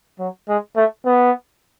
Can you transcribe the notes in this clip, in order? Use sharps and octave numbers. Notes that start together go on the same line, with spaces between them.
F#3
G#3
A3
B3